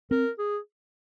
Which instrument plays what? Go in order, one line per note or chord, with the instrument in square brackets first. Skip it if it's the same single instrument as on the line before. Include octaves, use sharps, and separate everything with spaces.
[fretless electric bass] C4 [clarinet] A#4
[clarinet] G#4